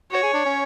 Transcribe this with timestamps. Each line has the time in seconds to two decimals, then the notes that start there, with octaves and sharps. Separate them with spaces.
0.12 F#4 C#5
0.23 G#4
0.34 D4
0.45 C#4